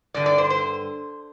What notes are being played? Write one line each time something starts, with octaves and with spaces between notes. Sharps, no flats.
G2 D3 D5
D5
C5
C5